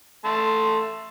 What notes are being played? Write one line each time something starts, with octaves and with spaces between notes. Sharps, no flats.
A3 A5 C6